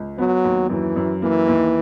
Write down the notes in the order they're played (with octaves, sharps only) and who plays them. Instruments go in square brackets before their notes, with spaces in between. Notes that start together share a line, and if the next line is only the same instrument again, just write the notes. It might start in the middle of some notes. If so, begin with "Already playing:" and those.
Already playing: [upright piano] C#2
[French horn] F#3 [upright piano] B3
[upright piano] D#2
[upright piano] F#2 [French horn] E3
[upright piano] F#2
[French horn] E3 [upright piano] A#3
[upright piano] D#2